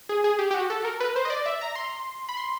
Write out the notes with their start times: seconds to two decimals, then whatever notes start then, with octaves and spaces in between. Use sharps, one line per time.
0.09 G#4
0.24 G#4
0.39 G4
0.51 G4
0.54 F#4
0.70 A4
0.85 A#4
1.00 B4
1.16 C5
1.25 D#5
1.30 D5
1.46 E5
1.61 A#5
1.76 C6
2.29 B5
2.37 C6